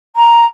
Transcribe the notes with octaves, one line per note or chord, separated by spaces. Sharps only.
A#5